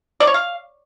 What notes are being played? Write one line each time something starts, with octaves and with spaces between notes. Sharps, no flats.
D5
C#5
F5